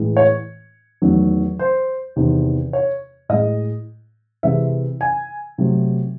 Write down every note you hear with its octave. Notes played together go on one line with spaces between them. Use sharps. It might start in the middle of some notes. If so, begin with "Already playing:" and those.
Already playing: A2 E3 G#3
C#5
E2 D#3 F#3 A3
C5
E2 C3 D#3
C#5
A2 G#3 D#5
C3 E3 G#3 E5
G#5
C3 F#3 A3